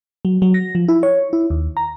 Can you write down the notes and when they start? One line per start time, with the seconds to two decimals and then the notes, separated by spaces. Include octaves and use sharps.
0.25 F#3
0.42 F#3
0.54 A#6
0.75 F3
0.88 E4
1.03 C#5
1.33 E4
1.50 D#2
1.77 A#5